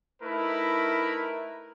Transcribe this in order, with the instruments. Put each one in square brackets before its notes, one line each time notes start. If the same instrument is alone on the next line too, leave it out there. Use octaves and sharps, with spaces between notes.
[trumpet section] A3 D#4 E4 A#4 B4